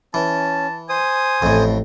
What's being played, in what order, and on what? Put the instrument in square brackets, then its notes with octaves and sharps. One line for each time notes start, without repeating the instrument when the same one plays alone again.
[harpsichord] E3 [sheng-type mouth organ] C#4 [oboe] A5
[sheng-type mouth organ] C5 D#6 [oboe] G#5
[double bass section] A1 [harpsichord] F2 A2